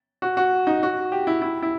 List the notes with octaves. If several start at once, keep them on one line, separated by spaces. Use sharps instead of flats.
F#4
F#4
D#4
F#4
G4
E4
E4
E4